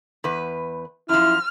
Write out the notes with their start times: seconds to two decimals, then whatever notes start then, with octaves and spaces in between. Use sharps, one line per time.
0.24 E2 B4
1.09 F#2 F3 E4 F6